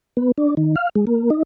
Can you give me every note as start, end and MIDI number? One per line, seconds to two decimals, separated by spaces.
0.17 0.32 59
0.38 0.55 62
0.57 0.75 51
0.76 0.89 77
0.95 1.05 56
1.07 1.30 58
1.30 1.43 63